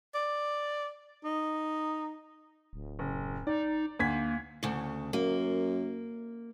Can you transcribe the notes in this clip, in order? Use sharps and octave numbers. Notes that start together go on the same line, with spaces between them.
D5
D#4
D1
F#1
D#4 D5
D2 A#3 G#6 B6
D2 C#3
F#2 A#3